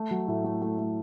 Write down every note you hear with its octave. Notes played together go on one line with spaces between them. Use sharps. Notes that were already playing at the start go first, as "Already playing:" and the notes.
Already playing: A3
F#3
A2
A3
A3
A3